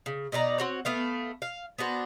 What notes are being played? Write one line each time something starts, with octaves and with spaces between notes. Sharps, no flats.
C#3
B2 D#4 D5 A#5
C4 F#4 C#5
A3 B3 F5
F5
B3 D4 F#4 C5